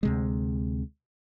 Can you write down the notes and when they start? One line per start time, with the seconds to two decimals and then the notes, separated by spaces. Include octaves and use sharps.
0.03 D2 C3 G#3